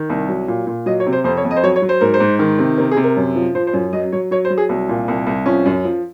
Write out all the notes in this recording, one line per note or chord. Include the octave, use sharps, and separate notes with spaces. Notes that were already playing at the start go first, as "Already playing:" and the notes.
Already playing: D#3
C2
F#3
A#2
A#2
F#3 D#5
C#5
C3
C5
F2 C5
C#5
F2
D#5
C5
F#3 C#5
C#5
F#3
C5
G#2 A#4
C5
G#2
D#3
C3
C3 A#4
G#4
C3
A#4
F#2
F3
F3 C5
C5
F#2
F#3 D#5
F#3 C#5
F#3 C#5
C5
F#3
G#4
C2
A#2
C2
C2
F3 C#4
F#2
F3